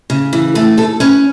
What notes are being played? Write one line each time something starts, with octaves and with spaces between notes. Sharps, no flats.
C#3
E3
A3 A4
D#2 A4
C#4 B4